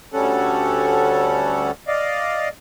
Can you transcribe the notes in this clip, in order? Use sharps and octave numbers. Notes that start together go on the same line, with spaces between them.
D2 G3 C#4 A4 F#5
D5 D#5 F5